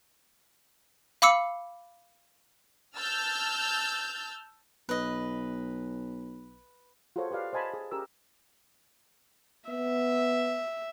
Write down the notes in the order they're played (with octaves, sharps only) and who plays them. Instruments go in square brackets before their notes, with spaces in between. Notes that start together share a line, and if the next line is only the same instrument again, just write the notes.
[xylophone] F5 B5 D6 E6 C#7
[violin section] A5 E6 F6 G6 A6
[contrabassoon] B1 [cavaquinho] B4 D#5
[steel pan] F4 F#4 G#4 A4 C5 C#5
G4 B4 D5 F5
C5 D#5 G#5 A5 B5
G#4
C#4 G4 G#4 A#4 E6
[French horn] B3 [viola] E5